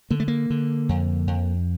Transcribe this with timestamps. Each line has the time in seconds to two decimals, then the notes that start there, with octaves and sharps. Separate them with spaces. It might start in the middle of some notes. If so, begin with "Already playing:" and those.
0.10 D3 A#3
0.20 A3
0.28 A#3
0.50 D3
0.89 F2
1.27 F2